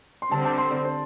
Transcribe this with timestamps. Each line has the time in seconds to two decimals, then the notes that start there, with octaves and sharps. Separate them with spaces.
0.22 C6
0.31 D3 G3 C4 A5
0.45 A5
0.58 C6
0.71 D5
0.85 C5